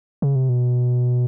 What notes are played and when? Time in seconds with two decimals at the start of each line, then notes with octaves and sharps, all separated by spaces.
0.22 C#3
0.35 C3
0.49 B2